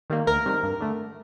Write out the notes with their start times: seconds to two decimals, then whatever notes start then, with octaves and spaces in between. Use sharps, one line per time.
0.10 D#3 G3 A#3
0.27 D2 A#4
0.46 C3 D#3 G3
0.63 G2
0.80 D3 A3